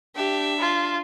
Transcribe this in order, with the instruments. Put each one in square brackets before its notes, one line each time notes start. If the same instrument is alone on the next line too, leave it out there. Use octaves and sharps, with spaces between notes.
[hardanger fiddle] D4 E5 [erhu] G4
[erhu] F4